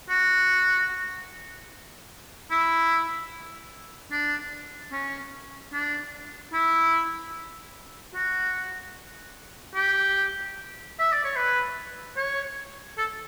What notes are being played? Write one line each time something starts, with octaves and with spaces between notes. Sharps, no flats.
F#4
E4
D4
C#4
D4
E4
F#4
G4
E5
D5
C#5
B4
C#5
A4